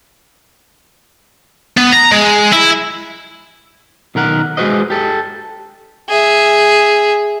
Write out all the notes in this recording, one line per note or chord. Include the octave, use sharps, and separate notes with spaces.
B3
A#5
G#3
E4
B1 D#3 A#4 F#5
G#3 A3 F#4 B4 C5 D#5
G4 A4
G#4 E5